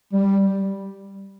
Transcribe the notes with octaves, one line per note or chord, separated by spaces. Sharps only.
G3